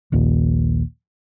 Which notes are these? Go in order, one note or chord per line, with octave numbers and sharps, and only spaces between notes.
A#1 D#2 A#2